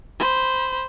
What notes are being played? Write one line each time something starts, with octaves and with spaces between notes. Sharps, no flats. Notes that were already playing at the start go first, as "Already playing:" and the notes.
C5 B5